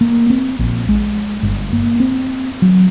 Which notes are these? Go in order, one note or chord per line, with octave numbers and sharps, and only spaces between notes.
A#3
C4
A#1
G#3
G1
A#3
C4
F#3